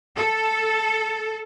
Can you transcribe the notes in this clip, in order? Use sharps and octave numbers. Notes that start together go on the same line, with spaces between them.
A4